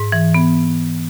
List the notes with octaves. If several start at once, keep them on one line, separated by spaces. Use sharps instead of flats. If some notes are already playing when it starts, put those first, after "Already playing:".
Already playing: G#2
E3
B3